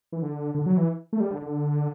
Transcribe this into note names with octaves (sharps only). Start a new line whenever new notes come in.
E3
D3
D3
F#3
E3
A3
G3
D3
D3